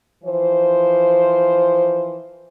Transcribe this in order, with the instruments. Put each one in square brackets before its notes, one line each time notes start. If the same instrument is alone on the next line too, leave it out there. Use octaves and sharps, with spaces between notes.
[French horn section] E3 F3 C5